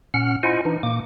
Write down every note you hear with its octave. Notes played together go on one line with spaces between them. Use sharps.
A#2 C#4 F#5 F6
E4 F4 C5 D#5 F#5 G#5
E3 D4 D#4
A#2 A#3 D6